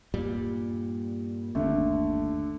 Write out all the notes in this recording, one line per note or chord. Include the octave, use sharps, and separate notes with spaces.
G2 A#2 G3
G1 D#2 D3 A3